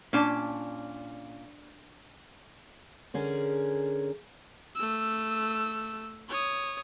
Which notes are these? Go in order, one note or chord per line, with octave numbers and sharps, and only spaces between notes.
A#2 C#4 D4 A5
D3 C#4 G#4 A#4
A3 E6
C#5 D#6